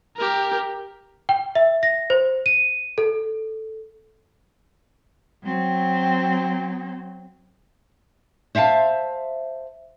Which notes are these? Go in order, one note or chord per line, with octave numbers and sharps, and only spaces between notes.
G4 A#4
G5
E5
A#6
C5
D#7
A4
F#3 C4
C5 E5 F5 G5 A5